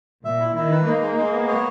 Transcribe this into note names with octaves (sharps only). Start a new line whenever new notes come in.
A#2 E5
E4
D#3 E4
B4
A#3 D#4
G#3
G#3
B3
C#5